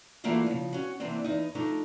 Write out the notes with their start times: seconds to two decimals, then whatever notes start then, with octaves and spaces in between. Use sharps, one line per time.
0.24 E3 A3 A#3 D4 F4 F#4
0.46 C#3 F3
0.73 C#4 F#4
1.00 C3 E3 A#3 C4 D4
1.24 E2 D#4
1.55 F3 A3 D4 D#4